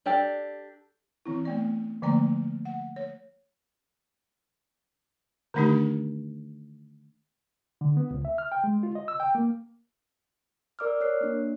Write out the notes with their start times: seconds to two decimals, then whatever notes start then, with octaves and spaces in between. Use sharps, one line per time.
0.06 D4 G4 A4 D5
1.25 E3 C4 E4
1.45 A3 B3 D5
2.02 D3 F3 A3 A#3 D5 A#5
2.65 F#5
2.96 C#5
5.54 D3 D#3 A3 D4 D#4 G4
7.81 D3
7.97 B3
8.11 C#2
8.25 E5
8.38 F6
8.52 G5
8.64 G#3
8.83 F4
8.95 D#5
9.08 E6
9.20 G5
9.35 A#3
10.79 A#4 D5 D6 E6 F6
11.01 A#4 C#5 F#6 C7
11.21 A#3 D4